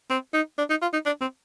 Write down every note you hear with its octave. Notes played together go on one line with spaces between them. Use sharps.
C4
D#4
D4
D#4
F4
D#4
D4
C4